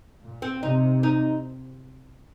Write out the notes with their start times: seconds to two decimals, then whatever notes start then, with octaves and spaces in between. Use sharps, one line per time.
0.22 A#2
0.42 C4
0.63 C3 D#4
1.03 D#4